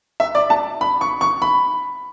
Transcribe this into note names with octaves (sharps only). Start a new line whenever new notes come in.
E5
D5
A5
B5
C#6
C#6
B5